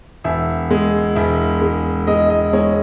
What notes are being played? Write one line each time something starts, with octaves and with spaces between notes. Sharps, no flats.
E1 E5
G#3
E1 E5
G#3
G#3 D#5
D#5
G#3 C#5